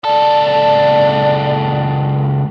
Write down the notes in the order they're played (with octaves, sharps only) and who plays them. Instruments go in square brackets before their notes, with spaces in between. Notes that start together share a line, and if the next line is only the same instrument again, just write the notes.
[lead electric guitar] C#2 A4 [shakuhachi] D5